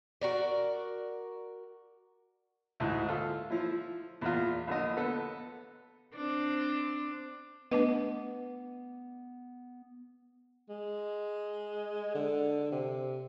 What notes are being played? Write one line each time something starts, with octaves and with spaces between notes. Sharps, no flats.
F#4 A#4 D5
D2 G#2 E3
F4 A4
F3 E4
E2 A#2 F4
A#1 D3 D#5
B3 A4
C4 D4
A3 B3 D4 B4 D#5
G#3
D3
C3